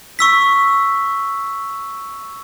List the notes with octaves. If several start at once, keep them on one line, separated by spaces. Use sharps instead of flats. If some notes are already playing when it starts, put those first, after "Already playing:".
C#6 E6 B6